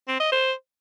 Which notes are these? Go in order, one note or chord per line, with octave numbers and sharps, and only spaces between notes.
C4
D#5
C5